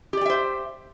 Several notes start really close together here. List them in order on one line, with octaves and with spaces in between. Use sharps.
G4 D5 G5 E5 C5